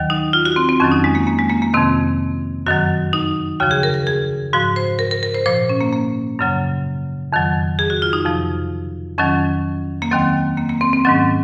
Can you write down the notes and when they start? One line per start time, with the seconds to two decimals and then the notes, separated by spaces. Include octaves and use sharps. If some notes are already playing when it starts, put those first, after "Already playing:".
Already playing: D#2 D#3 F#3
0.10 D#4
0.33 F4
0.45 F#4
0.56 C4
0.69 C4
0.80 F2 D#3 F#3 C#4
0.92 D#4
1.04 G#3
1.15 A#3
1.27 A#3
1.39 G#3
1.49 A#3
1.62 A#3
1.73 F2 C3 D#3 C4
2.66 F#2 D#3 F#3 F#4
3.13 D#4
3.60 D#2 C#3 F3 F#4
3.71 G#4
3.83 A#4
3.94 A#4
4.07 G#4
4.53 G#2 F3 F#4
4.76 C5
4.99 A#4
5.11 A#4
5.23 A#4
5.35 C5
5.46 A#2 F3 C5
5.69 C#4
5.81 A#3
5.93 A#3
6.39 F#2 C#3 F#3
7.33 F2 D#3 F#3
7.79 G#4
7.90 F#4
8.02 F4
8.13 D#4
8.25 F2 C3 F3
9.18 F2 D#3 F#3 C#4
10.02 A#3
10.12 D#2 D#3 F#3 C4
10.57 A#3
10.69 A#3
10.81 C4
10.93 C4
11.05 G#2 D#3 F#3 C#4